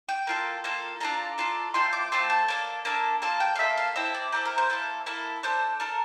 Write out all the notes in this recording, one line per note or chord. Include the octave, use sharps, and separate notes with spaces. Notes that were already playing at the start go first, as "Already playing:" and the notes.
G5
A#3 F4 A4
A#3 F4 A4
D4 F4 A4 A#5
D4 F4 A4
A3 C4 F4 A4 C6
D6
A3 C4 F4 A4 C6
A5
A#3 D4 A4
A#3 D4 A4
A#3 F4 A4 A5
G5
F5
A#3 F4 A4 E5
F5
C4 E4 A4 E5
D5
C4 E4 A4 A#4
A#4
C5
A#3 E4 A4
A#3 E4 A4
D4 A4 C5
D4 A4 A#4